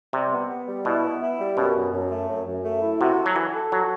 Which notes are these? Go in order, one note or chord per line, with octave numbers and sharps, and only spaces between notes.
C3 G3
B3
B3
G3
B2 E4
B3
E4
G3
F#2 B2
F#2
F#2
A3
F#2
F#2
A3
E4
C3 F#4
A4
F#3
E3 A4
A4
F#3 F#4